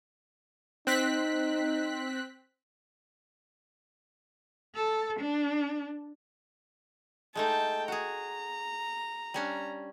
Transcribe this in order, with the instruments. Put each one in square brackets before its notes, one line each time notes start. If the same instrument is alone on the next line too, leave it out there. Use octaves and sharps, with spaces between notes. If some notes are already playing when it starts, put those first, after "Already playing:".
[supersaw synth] C4 F#6 B6 [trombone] D#4
[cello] A4
D4
[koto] G#3 A3 D#4 [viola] G5 A5
[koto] F#4 G#4 [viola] A#5
[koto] G3 C#4 D4